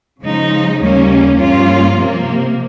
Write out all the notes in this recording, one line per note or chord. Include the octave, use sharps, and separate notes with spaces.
C#3 F3 G#3 D#4
D#2 C#3 G3 A#3 C#4
G2 F3 A#3 C#4 F4
C3 F3 A#3